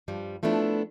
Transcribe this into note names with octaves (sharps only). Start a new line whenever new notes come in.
G2 F3 G3
F3 A3 B3 D4 E4